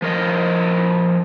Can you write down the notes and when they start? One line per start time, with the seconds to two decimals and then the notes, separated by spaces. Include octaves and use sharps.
0.02 F3 A#4 D#5